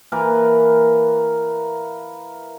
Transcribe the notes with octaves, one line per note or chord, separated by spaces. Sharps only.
E3 A#3 A#4 B4